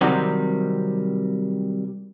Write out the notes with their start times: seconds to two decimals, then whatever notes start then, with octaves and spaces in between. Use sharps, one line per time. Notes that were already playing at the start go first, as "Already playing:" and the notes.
0.01 C3 D#3 F#3 G3 C4